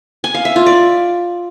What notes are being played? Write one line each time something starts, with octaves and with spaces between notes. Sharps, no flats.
G#5
F5
E5
F4
D5